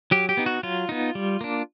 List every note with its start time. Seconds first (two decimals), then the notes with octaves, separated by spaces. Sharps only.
0.11 F#3 G4
0.29 G4
0.37 B3 D#4
0.46 F#4
0.63 F#3 F4
0.89 B3 D#4
1.15 G3
1.41 A#3 D4